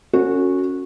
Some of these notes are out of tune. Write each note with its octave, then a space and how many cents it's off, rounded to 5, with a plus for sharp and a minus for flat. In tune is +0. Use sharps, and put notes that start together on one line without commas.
C#4 +0 F#4 -15 A4 +40